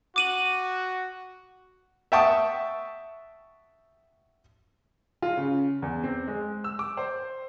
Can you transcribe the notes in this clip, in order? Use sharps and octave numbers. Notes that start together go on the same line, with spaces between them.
F#4 D6 D#7 F#7
E5 F#5 G5 A5 C#6 D#6
F4
C#3
E2
C4
G#3
E6
D6
C5